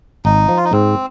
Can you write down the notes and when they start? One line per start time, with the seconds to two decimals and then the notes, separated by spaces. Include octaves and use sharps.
0.25 G#1 D#4
0.49 F3
0.57 F4
0.65 D#4
0.73 G#2 C4